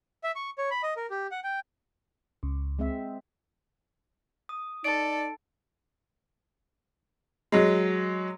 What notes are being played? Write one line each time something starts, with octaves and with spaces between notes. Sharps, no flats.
E5
C#6
C#5
B5
D#5
A#4
G4
F#5
G5
C#2
G#3 C4 E5
D#6
D#4 A4 D5 D7
F#3 G#3